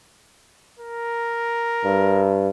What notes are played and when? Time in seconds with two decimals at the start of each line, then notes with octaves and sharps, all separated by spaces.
0.79 A#4
1.85 G2